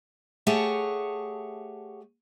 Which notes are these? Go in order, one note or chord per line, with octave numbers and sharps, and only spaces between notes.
A3 G4 G#4 C#5 F#5 A5